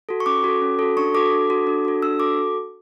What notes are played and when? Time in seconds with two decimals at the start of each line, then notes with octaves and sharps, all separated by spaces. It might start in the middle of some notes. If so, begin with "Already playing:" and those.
0.09 F#4 A4
0.20 C#6
0.26 C#4 D6
0.44 F#4 A4
0.62 C#4
0.79 F#4 A4
0.97 D4 C#6
1.14 F#4 A4 D6
1.32 D4
1.50 F#4 A4
1.67 D4
1.85 F#4 A4
2.02 D4 E6
2.20 F#4 A4 D6